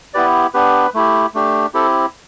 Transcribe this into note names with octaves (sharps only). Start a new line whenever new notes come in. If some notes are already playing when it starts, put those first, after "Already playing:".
B3 E4 G4 B4 D5
B3 D4 G4 B4
A3 E4 G4
A3 D4 G4
C4 E4 G4 A4